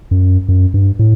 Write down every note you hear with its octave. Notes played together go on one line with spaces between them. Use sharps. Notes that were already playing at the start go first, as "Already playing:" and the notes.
F#2
F#2
G2
A2